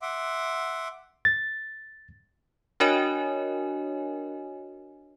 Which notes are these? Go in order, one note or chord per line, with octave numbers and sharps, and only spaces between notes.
E5 F#5 C6 D6
A6
D4 F#4 A#4 C#5 D#5 G#5